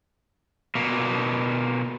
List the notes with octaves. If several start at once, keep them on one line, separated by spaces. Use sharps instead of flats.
B2 A#3